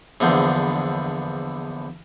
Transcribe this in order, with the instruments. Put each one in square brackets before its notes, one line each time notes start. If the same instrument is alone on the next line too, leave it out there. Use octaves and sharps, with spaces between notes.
[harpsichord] A#1 E2 D3 C5